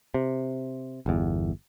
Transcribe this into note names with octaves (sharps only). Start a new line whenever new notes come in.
C3
G1 E2